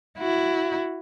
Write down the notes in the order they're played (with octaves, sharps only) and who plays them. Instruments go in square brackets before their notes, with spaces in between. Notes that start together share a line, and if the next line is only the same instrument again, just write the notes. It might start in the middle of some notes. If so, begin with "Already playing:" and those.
[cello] E4 F#4